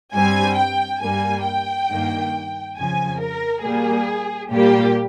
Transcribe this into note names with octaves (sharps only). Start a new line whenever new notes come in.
G2 G3 C4 G#5
G5
G2 G3 A#3 G#5
G5
G2 D#3 A#3
F2 C#3 F3 G#5
A#4
A#2 G3 A#3 G#4
A#2 G3 A#3 G4